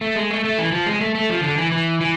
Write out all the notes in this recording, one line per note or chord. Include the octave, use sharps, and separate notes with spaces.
A3
G#3
A3
A3
E3
F3
G#3
A3
A3
F3
D3
E3
E3
E3